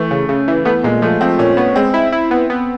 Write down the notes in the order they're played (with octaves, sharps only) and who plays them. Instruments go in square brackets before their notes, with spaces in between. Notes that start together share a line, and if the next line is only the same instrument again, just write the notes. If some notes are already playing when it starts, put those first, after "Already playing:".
Already playing: [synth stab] E3 [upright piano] A3
[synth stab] C#3
C#3
E3
[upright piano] A3 [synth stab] B3
[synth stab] A#2 [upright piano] G#3
[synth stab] F3 [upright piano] A3
[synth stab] F3 [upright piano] C4
[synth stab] A#2 [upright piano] C#4
[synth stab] B3 [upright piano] C#4
[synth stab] G#3 [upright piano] C4
[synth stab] E4
E4
B3
B3